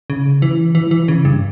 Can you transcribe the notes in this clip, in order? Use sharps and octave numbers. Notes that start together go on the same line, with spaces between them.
C#3
E3
E3
E3
C#3
G2